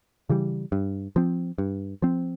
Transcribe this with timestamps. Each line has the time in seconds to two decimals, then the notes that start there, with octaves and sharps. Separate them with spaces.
0.29 C#3 E3 G3
0.72 G2
1.16 F3 C4
1.58 G2
2.02 F3 C4